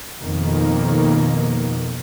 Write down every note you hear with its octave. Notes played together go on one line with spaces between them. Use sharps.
F2 B2 D#3 A#3